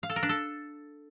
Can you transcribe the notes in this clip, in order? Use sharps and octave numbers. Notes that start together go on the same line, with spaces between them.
F5
A4
A#4
D4
A4